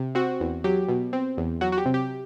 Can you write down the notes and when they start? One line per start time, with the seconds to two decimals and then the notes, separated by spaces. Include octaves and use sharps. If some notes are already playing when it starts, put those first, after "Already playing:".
Already playing: C3
0.15 C4 F#4
0.40 E2
0.64 F#3 G4
0.89 B2
1.13 C4
1.37 E2
1.61 F#3 F#4
1.72 F#4
1.78 G4
1.86 C3
1.94 G4